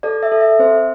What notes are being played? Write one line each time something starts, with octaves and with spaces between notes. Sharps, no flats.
A4 D5
E5
A4
E5
C4 C5